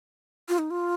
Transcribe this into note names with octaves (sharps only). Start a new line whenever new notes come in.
F4
D#4
F4